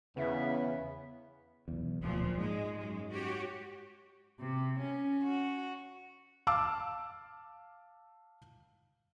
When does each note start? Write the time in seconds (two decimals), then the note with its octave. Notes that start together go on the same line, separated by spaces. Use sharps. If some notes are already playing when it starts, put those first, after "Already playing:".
0.17 E2 C#3 B3 E5
1.68 B1 E2
2.01 D1 B1 A#2 F3
2.38 G#2 G#3
2.78 F#2 G#3
3.11 F#4 G4 C#5
4.39 C3
4.80 C#4
5.24 F#4
6.47 F5 A5 D6 E6